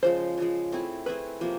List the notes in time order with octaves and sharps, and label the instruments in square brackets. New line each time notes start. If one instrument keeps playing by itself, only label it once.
[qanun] C#3 F3 G#3 [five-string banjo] C5
[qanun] C#3 F3 G#3
A3 C4 E4 G#4
[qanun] A3 C4 E4 G#4 [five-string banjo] B4
[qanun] C3 F3 A#3